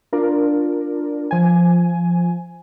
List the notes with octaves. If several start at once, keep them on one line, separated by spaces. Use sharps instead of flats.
D4 F4 A#4 D5
F3 G#5